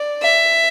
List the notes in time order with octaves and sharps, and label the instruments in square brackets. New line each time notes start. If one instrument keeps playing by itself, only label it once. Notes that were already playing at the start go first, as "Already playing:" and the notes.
Already playing: [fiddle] D5
E5